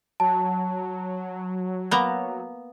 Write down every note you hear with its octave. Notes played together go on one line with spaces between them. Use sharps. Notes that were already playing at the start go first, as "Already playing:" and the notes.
F#3 A5
A#3 B3 A#5